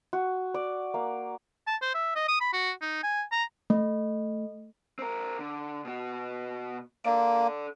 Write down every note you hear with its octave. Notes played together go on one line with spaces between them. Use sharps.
F#4
D5
A#3
A5
C5
E5
D#5
D#6
B5
F#4
D#4
G#5
A#5
A3
C4 A#4
D3
B2 F#4
A#3 A4 D5